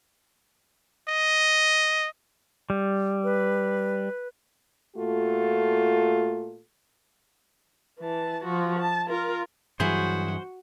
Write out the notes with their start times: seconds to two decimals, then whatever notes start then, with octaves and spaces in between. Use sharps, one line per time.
1.08 D#5
2.70 G3
3.24 B4
4.96 A#2 A3 F4 F#4 A4
7.99 E3 A5
8.45 F3 F#4
8.79 A5
9.09 F4 A#4
9.80 G2 E3 F#3 E4 F#4 G#4 C5